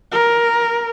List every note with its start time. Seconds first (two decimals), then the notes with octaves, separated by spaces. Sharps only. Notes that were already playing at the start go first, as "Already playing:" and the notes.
0.12 A#4